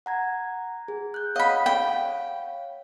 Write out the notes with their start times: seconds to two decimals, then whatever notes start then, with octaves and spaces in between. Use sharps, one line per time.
0.06 F#5 A#5 G#6
0.88 G#4
1.14 F#6 G6
1.36 C#5 D#5 F5 F#5 B5
1.66 G5